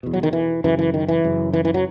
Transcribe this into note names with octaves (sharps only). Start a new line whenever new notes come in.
E2 B2
F#3
D#3
E3
F#2 C#3 E3
E3
D#3
E3
F#2 C#3
E3
E3
F#3